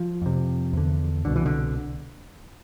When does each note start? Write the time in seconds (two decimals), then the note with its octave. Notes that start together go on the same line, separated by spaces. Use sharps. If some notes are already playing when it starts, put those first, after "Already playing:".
Already playing: F3
0.22 F2 C3
0.73 E2 D3
1.25 C2 B2 D3
1.36 E3
1.46 D3